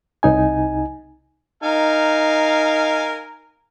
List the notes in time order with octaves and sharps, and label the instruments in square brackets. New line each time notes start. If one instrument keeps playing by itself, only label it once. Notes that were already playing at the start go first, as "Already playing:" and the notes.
[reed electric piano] C2 D#4 G#5
[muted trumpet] D#4 [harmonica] A#4 F5 G#5